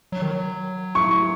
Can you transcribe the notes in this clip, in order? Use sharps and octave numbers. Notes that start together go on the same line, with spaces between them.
F#3
D#3
F#3
C#6